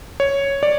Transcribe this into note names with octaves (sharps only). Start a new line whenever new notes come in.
C#5
D5